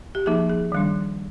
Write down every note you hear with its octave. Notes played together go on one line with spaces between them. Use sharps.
G4
F3 A#3 D#4 G#4
G#4
D#3 G3 D4